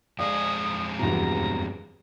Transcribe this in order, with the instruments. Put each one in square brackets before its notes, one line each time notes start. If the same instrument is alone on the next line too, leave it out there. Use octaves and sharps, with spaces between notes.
[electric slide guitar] F2 G#3 G#4 [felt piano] D5 F5 [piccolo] D#6
[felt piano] E2 G2 B2 [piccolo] A#5